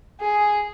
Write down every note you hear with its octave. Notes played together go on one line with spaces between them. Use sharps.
G#4